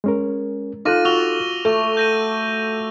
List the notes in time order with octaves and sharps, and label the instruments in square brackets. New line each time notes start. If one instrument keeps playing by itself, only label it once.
[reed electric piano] G#3 C#4 A#4
[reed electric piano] D#4 A4 F#6 [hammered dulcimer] F4 [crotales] D6 A#6 D#7
[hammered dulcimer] F#4 [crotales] E6 F7 G7
[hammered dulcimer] A3 [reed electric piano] A4 [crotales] C#6
[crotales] G6 A#6 D#7